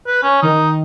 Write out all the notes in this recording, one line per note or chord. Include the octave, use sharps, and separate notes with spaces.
B4
C#4
D#3 D#4